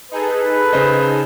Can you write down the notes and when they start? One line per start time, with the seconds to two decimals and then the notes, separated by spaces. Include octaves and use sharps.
0.11 D#4 G#4 A4 B4
0.73 C#3 C5 D#5